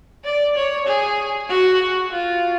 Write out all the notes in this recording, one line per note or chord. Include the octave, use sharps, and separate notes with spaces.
D5
C#5
G#4
F#4
F4